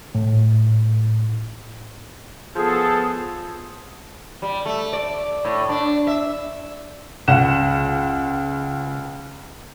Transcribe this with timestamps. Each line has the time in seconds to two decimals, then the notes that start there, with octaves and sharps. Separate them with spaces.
0.15 A2
2.55 F3 B3 G#4 A4
4.42 G3
4.66 A3
4.93 D5
5.45 A2
5.69 D4
6.07 E5
7.28 C#2 F#5 E7